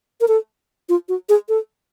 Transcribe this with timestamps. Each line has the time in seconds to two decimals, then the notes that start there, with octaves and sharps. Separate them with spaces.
0.21 A#4
0.28 A4
0.89 F4
1.09 F#4
1.29 G#4
1.49 A4